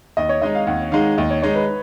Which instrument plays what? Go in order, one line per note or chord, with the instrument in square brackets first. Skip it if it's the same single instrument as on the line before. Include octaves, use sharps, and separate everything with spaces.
[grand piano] D#2 [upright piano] D#5
[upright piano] C#5
[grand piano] D#3 G#3 D#4 [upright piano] D#5
[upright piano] F5
[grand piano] D#2 [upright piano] F#5
[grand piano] D#3 G#3 D#4 [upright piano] F5
[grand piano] D#2 [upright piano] D#5
[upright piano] C#5
[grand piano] D#3 G#3 D#4 [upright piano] C#5
[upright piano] B4